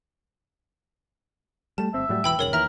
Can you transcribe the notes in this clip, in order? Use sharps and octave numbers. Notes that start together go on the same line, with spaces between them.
G3 A3 A5
G1 C4 E5
A2 F#3 G3
E1 E3 G5 B5 E6
D#1 F#2 C#3 A#4 C#5 F#7
D#2 E3 A#4 E5 A#5